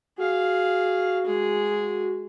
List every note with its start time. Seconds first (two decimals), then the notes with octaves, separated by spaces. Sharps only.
0.18 F#4 G#4 F5
1.25 G#3 G#4